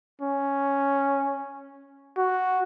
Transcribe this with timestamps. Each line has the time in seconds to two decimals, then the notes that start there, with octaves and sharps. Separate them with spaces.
0.22 C#4
2.17 F#4